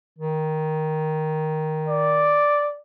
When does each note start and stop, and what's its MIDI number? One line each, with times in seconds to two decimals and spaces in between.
0.19 2.45 51
1.89 2.77 74